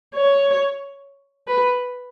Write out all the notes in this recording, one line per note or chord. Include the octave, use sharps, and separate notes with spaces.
C#5
B4